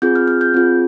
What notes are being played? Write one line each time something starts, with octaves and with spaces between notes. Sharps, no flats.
C4 F4 G#4 G6
F6
F6
G6
C4 F4 G#4